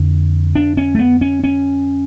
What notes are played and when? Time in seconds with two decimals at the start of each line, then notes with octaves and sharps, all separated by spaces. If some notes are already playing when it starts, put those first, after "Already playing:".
Already playing: F2 D3
0.55 D4
0.77 C#4
0.95 A3
0.99 B3
1.21 C#4
1.44 C#4